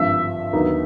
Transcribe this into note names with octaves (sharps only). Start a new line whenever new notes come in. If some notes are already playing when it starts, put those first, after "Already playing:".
Already playing: G#1 G2 D3 F3 E5
D#2 D3 F#3 B3 D#4